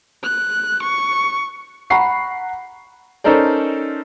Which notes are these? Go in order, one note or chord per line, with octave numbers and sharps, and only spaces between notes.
F#6
C#6
F#5 A#5 B5 C#6 C7
C#4 D#4 A4 A#4 C5 D5